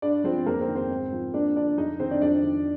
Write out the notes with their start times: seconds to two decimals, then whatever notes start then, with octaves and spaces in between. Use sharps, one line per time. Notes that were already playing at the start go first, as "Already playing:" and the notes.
0.02 G2 D4 D5
0.24 F3 C4 C5
0.46 F2 A#3 A#4
0.61 C4 C5
0.68 D#3
0.76 C4 C5
0.91 G#2
1.12 F3
1.34 A#3 D4 D5
1.56 D3 D4 D5
1.78 F2 D#4 D#5
2.00 D#3 C4 C5
2.11 D4 D5
2.22 F2 D4 D5
2.44 D#3